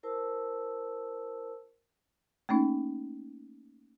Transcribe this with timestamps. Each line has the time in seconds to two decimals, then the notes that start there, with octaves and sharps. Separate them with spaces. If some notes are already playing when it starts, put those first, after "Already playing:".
0.03 E4 A#4 C5 A5 E6
2.49 A3 A#3 C#4 D#4